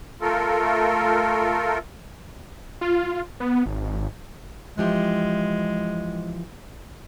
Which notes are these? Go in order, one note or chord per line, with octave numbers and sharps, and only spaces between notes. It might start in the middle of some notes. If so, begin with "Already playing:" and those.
A3 F4 A4 A#4
F4
B3
G#1
E3 F3 G#3 G4